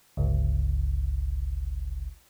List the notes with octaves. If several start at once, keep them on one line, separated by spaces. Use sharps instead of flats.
G1 C#2